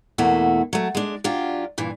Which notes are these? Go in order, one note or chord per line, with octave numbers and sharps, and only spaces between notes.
E2 B2 A3 A#3 E4 F#4
F#3 A3
G#3 D4
F#3 D4 F4 G4
G2 A#2 E3